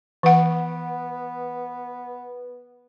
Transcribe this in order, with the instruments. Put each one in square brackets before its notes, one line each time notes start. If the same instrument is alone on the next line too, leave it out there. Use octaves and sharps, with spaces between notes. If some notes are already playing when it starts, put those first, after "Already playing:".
[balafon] E3 F#5 [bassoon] B3